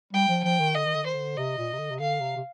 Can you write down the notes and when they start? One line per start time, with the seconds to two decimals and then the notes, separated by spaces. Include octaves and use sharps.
0.13 G3 G5
0.29 F3
0.44 F3 G5
0.60 D#3
0.75 D3 D#5
0.85 D#3
0.94 D3
1.04 D#3 C5
1.13 D3
1.37 C3 D#5
1.58 A#2
1.73 C3
1.79 D3
1.91 C3
2.00 D3 F5
2.21 C3
2.36 C3